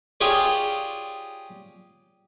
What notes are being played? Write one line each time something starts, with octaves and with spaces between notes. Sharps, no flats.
F4 G4 G#4 C#5 D5